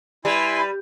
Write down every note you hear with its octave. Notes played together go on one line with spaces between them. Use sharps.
G3 E4 B4 G#5 C6